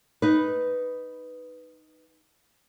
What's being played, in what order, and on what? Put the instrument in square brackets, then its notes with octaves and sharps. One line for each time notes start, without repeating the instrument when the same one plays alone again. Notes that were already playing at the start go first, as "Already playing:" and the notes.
[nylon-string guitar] D#4 B4